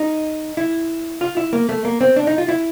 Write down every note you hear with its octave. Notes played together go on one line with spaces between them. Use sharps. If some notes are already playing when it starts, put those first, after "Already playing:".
Already playing: D#4
E4
F4
E4
A#3
A3
A#3
C4
D4
D#4
F4
E4